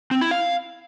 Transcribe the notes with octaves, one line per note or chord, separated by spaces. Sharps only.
C4
E4
F5